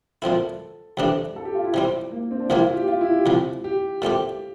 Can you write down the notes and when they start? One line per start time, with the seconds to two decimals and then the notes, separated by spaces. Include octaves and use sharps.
0.22 A#2 F3 C4 E4 A4
0.97 C2 C3 E3 A3 D4
1.36 A4
1.45 G4
1.55 F4
1.64 E4
1.74 C3 G3 C4
2.12 A#3
2.31 C4
2.40 D4
2.50 C2 C3 F3 A#3 E4
2.62 F4
2.76 G4
2.88 F4
3.01 E4
3.13 G4
3.26 C2 C3 F3
3.64 G4
4.02 A#2 A3 C4 G4